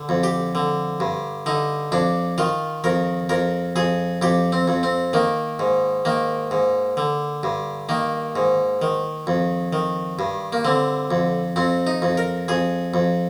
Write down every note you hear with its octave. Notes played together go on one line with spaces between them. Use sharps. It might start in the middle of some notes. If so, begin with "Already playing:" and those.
Already playing: D3
F2
G4
D3
G2
D3 D#4
F2 D4
D#3 F4
F2 A#4
F2 A#4
F2 G#4
F2 G4
C4
F2
C4
D#3 A#3
G#2
D#3 A#3
G#2
D3
G2
D#3 A#3
G#2
D#3
F2
D#3
G2
A#3
D3 C4
F2
F2 C4
D#4
F2
A#4
F2 G#4
F2